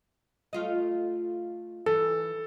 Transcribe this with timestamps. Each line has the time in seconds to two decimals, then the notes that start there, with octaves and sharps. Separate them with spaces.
0.53 A3 F4 D#5
1.86 E3 A4